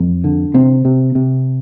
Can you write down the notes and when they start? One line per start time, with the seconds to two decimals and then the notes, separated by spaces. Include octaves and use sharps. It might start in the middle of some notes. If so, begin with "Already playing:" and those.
Already playing: F2
0.24 D3
0.54 C3 C4
0.85 C3
1.15 C3